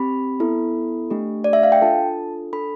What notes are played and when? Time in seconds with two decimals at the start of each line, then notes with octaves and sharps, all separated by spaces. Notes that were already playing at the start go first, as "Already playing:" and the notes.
Already playing: C4 G4 B5
0.40 B3 E4 A4
1.11 A3 D4 G4
1.44 D5
1.53 E5
1.63 F5
1.72 G5
1.81 D4 F4 A4 A5
2.53 D4 A4 B5